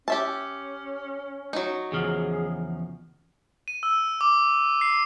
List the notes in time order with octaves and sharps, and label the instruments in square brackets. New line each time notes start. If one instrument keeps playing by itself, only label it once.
[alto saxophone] C#4 [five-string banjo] G4 E5 A5
[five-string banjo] F#3 D#4
[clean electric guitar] E2 C#3 F3 [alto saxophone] G#4
[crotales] D#7
E6
D6
C7